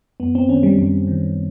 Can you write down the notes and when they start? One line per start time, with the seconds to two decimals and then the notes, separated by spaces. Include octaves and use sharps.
0.20 F#2 B3
0.35 C4
0.49 D#3 C#4
0.63 G3
0.78 F#2 G3
1.07 D#3